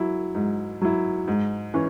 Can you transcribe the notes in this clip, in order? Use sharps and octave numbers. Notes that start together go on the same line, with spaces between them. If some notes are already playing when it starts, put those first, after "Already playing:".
Already playing: F#3 E4
G#2
F#3 E4
G#2
E3 C#4